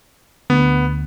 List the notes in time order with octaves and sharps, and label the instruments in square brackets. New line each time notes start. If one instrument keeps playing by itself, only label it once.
[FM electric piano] D2 [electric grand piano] B3